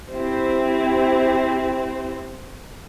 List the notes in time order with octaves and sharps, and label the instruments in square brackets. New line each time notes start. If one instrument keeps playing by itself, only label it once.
[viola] C4 C5 [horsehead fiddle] E4 G4